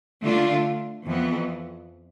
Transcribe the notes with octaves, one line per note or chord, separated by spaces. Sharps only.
D3 A3 D4 F4
F2 E3 B3